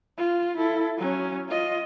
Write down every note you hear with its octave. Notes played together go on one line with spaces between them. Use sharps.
F4
E4 A4
F#3 C#4
F4 D#5